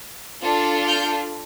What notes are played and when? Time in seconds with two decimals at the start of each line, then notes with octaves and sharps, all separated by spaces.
0.42 D4 F4 A4
0.87 F6 G6